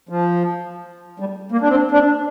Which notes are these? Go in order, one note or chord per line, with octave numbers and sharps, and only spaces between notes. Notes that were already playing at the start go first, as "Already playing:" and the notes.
F3
G3
A#3
D4
C4
D4